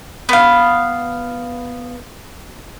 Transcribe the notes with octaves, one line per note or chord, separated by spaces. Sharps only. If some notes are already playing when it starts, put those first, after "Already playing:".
B3 F5